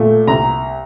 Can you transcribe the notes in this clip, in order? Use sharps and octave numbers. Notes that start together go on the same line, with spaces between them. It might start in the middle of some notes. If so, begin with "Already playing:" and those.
Already playing: A#2 A3
C2 A#5